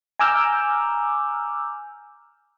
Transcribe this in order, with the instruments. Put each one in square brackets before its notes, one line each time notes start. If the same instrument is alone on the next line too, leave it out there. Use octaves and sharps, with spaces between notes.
[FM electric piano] G#5 A#5 D6 E6 F6 G6